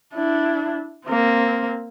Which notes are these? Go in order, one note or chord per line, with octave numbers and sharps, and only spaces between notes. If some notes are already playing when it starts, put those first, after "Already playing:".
D4 E4
A#3 C4